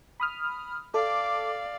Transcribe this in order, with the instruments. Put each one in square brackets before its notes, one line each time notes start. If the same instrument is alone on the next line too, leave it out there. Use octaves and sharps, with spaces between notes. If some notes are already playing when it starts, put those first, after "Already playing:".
[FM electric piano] B5 D#6 F6
[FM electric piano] A4 [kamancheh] D5 F5 [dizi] D6